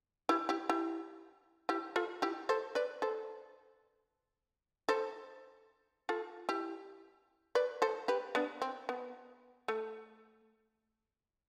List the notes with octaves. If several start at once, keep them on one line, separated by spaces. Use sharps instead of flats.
E4 G4
E4 G4
E4 G4
E4 G4
F4 A4
E4 G4
A4 C5
B4 D5
A4 C5
A4 C5
F4 A4
E4 G4
B4 D5
A4 C5
G4 B4
B3 D4
C4
B3
A3